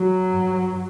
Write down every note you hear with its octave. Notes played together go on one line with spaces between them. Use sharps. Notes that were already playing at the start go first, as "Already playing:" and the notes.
Already playing: F#3
G2